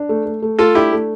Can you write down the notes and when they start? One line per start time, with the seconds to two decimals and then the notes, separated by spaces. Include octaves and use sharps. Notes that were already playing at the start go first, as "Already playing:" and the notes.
Already playing: D4
0.09 A3
0.26 A3
0.42 A3
0.59 A3 F4 A4
0.75 D4 E4 G4
0.92 A3